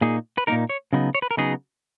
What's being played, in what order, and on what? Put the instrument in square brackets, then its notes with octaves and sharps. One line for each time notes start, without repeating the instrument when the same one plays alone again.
[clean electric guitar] A#2 A#3 D#4 G#4
B4
A#2 A#3 D#4 A#4
C#5
C#3 F#3 B3 D#4
C#5
B4
A#4
C#3 F#3 B3 D#4 G#4